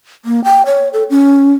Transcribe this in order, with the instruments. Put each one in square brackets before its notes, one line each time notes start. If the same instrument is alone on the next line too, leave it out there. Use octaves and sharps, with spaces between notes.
[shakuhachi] A#3
G5
C#5
A4
C#4